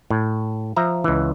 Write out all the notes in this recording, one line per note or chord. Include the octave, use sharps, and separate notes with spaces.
A2
F3 E5 A#5
C#2 E3